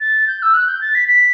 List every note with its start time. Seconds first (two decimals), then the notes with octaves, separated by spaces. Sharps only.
0.01 A6
0.27 G6
0.43 E6
0.54 F#6
0.68 G6
0.81 A6
0.95 B6
1.08 B6